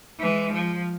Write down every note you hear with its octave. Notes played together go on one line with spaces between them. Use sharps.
E3 G#3
F3